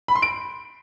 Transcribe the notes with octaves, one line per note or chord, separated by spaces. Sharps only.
B5
C6
D7